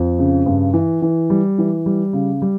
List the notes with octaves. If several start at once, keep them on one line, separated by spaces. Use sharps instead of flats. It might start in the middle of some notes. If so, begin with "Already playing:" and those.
Already playing: F2
C#3
G2
E3
E3
G3
E3
G3
C#3
G3